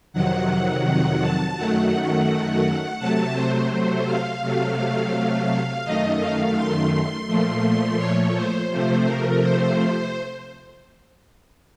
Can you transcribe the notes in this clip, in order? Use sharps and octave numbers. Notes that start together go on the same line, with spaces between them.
F2 C3 D#3 F#3 F#5
F#5
A5
F#2 D#3 F#3 A3 F#5
C3 F#3 A3 A5
C5
C5
F5
C3 F#3 A3
F#2 D#3 A3 D#5
F5
C6
C6
A#2 F3 A3
C#5
C5
C3 F3 A3 C5
A#4
C5